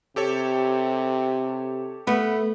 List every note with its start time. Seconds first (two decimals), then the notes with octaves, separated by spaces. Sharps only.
0.16 C3 G4 A4 C#5
2.07 A3 B3 B5